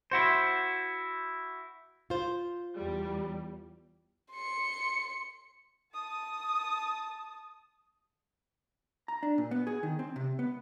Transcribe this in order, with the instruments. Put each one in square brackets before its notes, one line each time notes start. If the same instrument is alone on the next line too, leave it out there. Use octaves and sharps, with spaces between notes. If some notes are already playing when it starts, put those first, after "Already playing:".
[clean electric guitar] E4 F#4 C5
[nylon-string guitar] F4 C5
[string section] E2 G3
[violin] C6 C#7
[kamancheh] A5 D#6
[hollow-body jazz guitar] A#5
D4
A#2
B3
G#4
D#3
C4
C3
B3